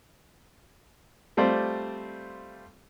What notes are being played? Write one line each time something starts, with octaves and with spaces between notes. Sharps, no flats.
G3 A3 C4 F4 C5 D5